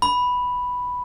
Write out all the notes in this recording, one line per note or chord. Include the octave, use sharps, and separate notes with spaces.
B5